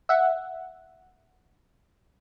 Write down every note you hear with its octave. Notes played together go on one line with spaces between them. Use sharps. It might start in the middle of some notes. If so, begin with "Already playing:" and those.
E5 F#5